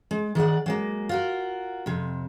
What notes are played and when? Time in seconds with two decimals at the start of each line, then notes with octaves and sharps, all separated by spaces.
0.11 G#3
0.35 D#3 G#4 D5 F#5
0.66 F#3 G#3 A#3
1.09 F4 F#4 A#4
1.86 F2 C3